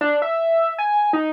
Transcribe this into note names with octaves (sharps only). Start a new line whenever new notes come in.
D4
E5
G#5
D#4